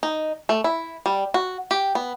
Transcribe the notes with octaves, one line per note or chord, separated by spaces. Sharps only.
D#4
A3
E4
G3
F#4
G4
B3